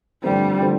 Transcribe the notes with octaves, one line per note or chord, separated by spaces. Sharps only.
G2 D3 F3 G3 A3 C4
D3 F3 A3 C4